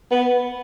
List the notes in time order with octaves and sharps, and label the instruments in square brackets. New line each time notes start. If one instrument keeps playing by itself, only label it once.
[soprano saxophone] B3